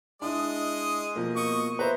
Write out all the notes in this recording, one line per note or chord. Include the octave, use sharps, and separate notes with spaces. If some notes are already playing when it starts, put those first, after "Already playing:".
G#3 D4 E4 D#5
B2 F3 A#3
D#5 C#6
B4 C5 E5 A#5